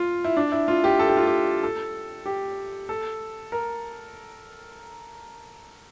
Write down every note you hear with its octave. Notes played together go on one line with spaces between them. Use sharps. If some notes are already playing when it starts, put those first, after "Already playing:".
Already playing: F4
E4
D4
E4
F4
G4
A4
G4
F4
G4
A4
G4
A4
A#4